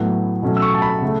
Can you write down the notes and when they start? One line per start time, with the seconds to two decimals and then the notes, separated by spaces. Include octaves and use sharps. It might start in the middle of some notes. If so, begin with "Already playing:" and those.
Already playing: A2 F#3 B3
0.42 B2 F#3 A3 C#4
0.57 E6
0.62 C#6
0.74 A5
0.82 B5
1.02 C#3 A3